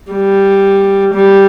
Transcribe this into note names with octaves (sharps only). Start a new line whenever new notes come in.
G3
G3